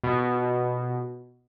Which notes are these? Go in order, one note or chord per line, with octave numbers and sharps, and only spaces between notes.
B2